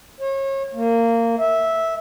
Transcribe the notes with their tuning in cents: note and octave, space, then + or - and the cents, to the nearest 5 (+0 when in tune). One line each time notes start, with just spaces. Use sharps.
C#5 -35
A#3 -20
E5 -10